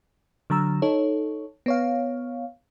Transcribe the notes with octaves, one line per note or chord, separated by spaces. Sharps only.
D3 F#3 A#5 E6
D#4 A4 C#5
B3 C#5 F5